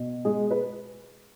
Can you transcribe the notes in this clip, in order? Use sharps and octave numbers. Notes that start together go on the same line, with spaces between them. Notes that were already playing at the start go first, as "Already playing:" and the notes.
Already playing: B2
G#3 G#4
B4